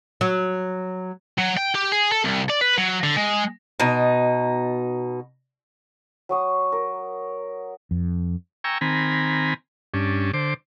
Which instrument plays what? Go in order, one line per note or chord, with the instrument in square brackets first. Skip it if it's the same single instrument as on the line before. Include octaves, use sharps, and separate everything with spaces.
[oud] F#3
[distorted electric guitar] F#3
G5
G4
G#4
A4
C2
D5
B4
F#3
D3
G#3
[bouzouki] B2 D#4
[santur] F#3 C#6 D#6
A#4
[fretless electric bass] F2
[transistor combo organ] G5 G#5 A#5 C#6 E6
D#3 C4 G#5 A#5 B5
G2 C#4 D4
D3 C5 D6